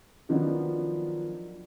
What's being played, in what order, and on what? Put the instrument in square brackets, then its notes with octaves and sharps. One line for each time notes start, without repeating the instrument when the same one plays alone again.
[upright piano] D#3 F3 F#3 B3 D4